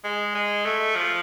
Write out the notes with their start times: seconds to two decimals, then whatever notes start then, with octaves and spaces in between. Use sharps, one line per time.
0.04 G#3
0.35 G#3
0.65 A3
0.96 F3